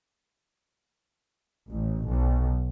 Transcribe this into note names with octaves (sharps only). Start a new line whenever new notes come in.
A1
B1